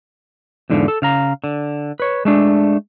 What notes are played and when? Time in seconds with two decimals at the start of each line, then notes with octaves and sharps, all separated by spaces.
0.70 E2 G#2 D3 F3
0.88 A4
1.02 C#3 F5 A#5
1.44 D3
2.00 B4 C#5
2.25 G#3 A3 D4